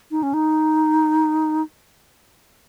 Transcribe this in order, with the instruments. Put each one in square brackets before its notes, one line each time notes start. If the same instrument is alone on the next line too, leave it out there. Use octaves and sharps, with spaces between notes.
[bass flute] D#4
C#4
D#4